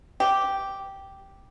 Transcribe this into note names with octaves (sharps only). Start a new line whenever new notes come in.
G4